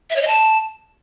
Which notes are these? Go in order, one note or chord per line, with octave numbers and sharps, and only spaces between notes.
E5
C#5
D#5
A5